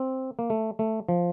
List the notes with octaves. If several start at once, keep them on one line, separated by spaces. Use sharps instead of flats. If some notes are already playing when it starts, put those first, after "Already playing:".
Already playing: C4
A#3
A3
A3
F3